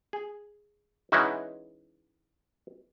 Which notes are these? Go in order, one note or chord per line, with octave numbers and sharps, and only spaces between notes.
G#4
E3 G#3 C#4 D#4 E4 F#4